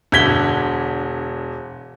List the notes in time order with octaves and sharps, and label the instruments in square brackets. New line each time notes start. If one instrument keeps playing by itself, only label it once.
[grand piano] E1 D3 G#6 B6 G7